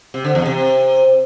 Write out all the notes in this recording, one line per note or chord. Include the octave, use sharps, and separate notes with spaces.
C3
D3
E2
C3